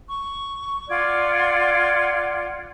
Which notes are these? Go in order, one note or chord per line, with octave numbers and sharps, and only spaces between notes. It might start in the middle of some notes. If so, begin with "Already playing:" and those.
C#6
F4 D5 F#5 G#6